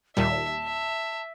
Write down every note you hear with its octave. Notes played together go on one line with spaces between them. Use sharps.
D#2 A#2 G3 E5 A5
E5